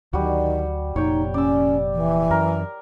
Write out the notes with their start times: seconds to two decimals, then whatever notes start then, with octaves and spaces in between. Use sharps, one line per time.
0.13 D2 D#3 F#3 G3 F#4
0.96 F1 F2 A#2 D#4 C#5 G5
1.34 C#4 D5 E6
1.94 E3
2.31 F#2 A#4